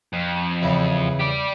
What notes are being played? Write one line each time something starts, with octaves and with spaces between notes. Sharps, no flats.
F2
E2 C#3 E4
G4 D5